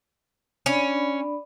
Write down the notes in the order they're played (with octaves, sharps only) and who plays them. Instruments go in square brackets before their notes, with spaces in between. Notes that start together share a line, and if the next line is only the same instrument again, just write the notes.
[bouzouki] C#4 [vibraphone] D4 D5 B5